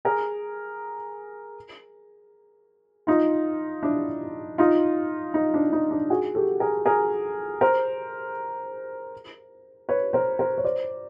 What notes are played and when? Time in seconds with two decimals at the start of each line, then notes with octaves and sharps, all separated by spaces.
0.05 G#4 A#4
3.07 D#4 F4
3.83 D4 E4
4.58 D#4 F4
5.34 D#4
5.54 D4
5.73 D#4
5.91 D4
6.10 F#4 G#4
6.35 G4 A4
6.60 G#4 A#4
6.85 G#4 A#4
7.61 A#4 C5
9.89 B4 C#5
10.13 A#4 C5
10.39 A#4 C5
10.58 C#5
10.64 C5 D5